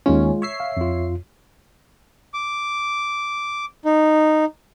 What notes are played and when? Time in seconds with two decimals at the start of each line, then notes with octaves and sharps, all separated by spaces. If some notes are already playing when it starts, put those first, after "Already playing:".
0.06 D#2 G#3 C#4 F4
0.42 C#5 E5 C7
0.60 F5
0.77 F2 F4
2.34 D6
3.85 D#4